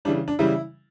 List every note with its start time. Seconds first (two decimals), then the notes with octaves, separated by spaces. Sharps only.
0.05 C#3 E3 G3 D4
0.28 D4
0.39 C#3 E3 G3 E4